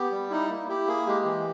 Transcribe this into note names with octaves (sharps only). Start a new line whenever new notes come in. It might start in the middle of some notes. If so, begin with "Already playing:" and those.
Already playing: B3 G4
G3
D#4 E4
A#3
E4 G4
A#3 G#4
G#3 G4
E3